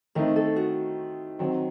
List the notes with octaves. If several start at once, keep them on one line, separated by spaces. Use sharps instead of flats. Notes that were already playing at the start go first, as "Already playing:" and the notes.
D#3 A3 C4 D#4 A#4
A4
F#4
D#3 F#3 C4